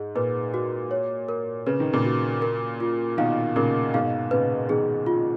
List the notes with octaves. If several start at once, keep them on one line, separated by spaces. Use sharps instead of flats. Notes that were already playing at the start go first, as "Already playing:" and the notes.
Already playing: G#2 G#4
A#2 B4
F#4
C#5
A#4
C#3 B4
D#3
A#2 C#3
F#4
A#4
F4
B2 D#3 F5
A#2 C#3 A#4
G#2 B2 F5
A#2 C#3 B4
B2 D#3 G#4
F4